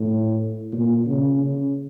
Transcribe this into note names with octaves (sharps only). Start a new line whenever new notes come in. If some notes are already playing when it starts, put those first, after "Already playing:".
Already playing: A2
A#2
C#3
C#3